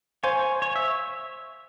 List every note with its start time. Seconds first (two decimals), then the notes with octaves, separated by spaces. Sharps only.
0.23 C5 C#5 F5 G#5 C6
0.62 C#5
0.76 E5